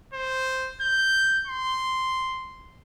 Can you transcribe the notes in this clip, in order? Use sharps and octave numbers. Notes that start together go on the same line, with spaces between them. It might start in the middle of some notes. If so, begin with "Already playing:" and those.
C5
G6
C6